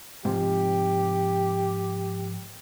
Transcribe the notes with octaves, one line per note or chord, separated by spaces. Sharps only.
G#2 C3 F3 G4